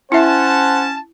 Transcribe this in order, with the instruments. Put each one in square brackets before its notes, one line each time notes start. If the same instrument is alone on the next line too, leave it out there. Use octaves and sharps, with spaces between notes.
[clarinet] C#4 [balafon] E4 E5 [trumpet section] C5 F#5 [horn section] A5